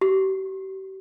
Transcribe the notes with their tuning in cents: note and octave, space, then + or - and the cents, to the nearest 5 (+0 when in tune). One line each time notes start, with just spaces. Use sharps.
G4 -40